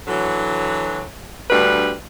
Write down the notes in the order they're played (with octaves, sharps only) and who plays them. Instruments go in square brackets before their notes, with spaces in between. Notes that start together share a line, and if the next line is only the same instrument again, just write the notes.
[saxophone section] D3 E3 F#3
D2 G2 B2 G3 B4